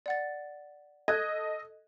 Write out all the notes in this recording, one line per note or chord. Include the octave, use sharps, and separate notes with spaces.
D5 F#5 A6
A4 D#5 F#6 G#6